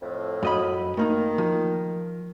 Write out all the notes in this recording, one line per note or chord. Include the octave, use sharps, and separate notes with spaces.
F2 A2
F#2 D#5 B5
D#3 A3 A#3 D#4
F3